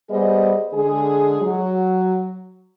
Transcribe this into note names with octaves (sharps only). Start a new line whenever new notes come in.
G3 B3 G#4 C5 D#5
D3 G#3 G#4
F#3